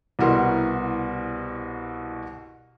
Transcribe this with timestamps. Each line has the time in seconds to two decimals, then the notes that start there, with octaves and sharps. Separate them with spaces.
0.19 C2 B2 E4 F#4 A#4 C6